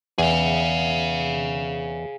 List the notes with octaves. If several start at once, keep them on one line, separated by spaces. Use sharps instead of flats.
E2 G#4 F5